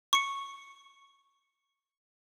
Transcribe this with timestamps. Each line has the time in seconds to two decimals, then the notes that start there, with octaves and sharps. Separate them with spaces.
0.13 C#6 C#7